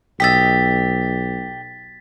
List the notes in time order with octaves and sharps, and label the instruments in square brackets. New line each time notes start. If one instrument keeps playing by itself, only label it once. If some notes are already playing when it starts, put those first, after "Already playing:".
[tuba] B1 [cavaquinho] G4 D#5 E5 [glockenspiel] A6 B6